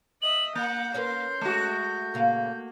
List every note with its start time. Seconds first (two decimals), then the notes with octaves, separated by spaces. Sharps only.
0.22 D#5 E5 F#7
0.55 A#3 F#5 G6
0.94 C#4 A#4 B4 C#5 C6
1.41 G#3 A3 F#4
2.14 A#2 C#3 A#3 F5